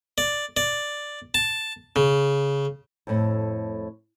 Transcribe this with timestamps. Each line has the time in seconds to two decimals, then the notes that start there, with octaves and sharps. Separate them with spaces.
0.18 D5
0.57 D5
1.34 A5
1.96 C#3
3.07 F2 A2